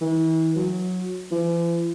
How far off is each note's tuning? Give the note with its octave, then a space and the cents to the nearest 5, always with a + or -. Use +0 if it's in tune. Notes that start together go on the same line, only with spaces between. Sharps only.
E3 -35
F#3 -20
E3 +45